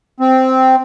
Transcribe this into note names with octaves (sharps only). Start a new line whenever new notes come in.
C4